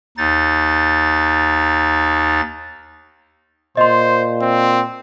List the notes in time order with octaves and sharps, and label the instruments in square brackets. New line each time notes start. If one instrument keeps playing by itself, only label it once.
[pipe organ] D#2 D#4 A6
[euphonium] A#2 [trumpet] C5 [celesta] D#5 C6
[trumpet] C4